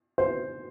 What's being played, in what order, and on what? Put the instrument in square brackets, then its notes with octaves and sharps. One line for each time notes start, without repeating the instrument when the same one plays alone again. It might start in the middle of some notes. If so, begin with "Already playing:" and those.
[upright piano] C5